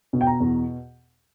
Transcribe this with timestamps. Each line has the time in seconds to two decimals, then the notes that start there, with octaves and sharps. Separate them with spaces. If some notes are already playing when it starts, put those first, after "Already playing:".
0.13 B2
0.21 G5
0.27 A#5
0.40 E2